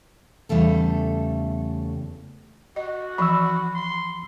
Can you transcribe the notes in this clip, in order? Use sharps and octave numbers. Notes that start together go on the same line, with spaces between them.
E2 C#3 G3 A3 A4
F#4 D#5
E3 F3 B5 C#6 E6
C6